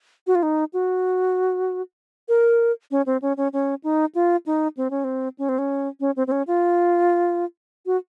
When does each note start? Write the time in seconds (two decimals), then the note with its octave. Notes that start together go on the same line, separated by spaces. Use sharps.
0.27 F#4
0.35 F4
0.43 D#4
0.73 F#4
2.29 A#4
2.91 C#4
3.06 C4
3.22 C#4
3.37 C#4
3.53 C#4
3.84 D#4
4.15 F4
4.46 D#4
4.77 C4
4.90 C#4
5.04 C4
5.38 C#4
5.49 C4
5.59 C#4
6.00 C#4
6.16 C4
6.27 C4
6.32 C#4
6.47 F4
7.86 F#4